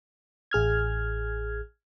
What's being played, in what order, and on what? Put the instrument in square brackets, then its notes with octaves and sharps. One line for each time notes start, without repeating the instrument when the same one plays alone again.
[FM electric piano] A1 G#4 F6 G#6